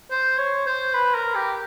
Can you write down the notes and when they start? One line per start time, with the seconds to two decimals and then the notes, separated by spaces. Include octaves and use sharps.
0.11 C5
0.38 C#5
0.66 C5
0.93 B4
1.14 A#4
1.35 G4